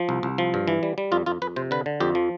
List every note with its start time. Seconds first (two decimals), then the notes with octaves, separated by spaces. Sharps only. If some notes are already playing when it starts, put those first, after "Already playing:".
Already playing: F3
0.09 C2
0.23 C2
0.38 F3
0.54 G2
0.68 E3
0.83 G3
0.98 G3
1.12 F2 F4
1.26 F2 F4
1.42 F2 B4
1.56 C3 C5
1.71 D3 B4
1.86 D3
2.00 F2 G4
2.15 F3